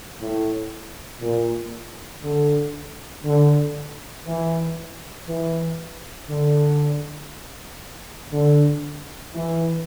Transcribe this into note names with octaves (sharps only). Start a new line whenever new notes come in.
A2
A#2
D3
D3
E3
E3
D3
D3
E3